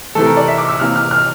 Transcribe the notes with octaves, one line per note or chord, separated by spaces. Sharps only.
C3 E3 A3 A4
A#4
D5
E5
D6
E6
C3 E3 A#3 F6
F6
F6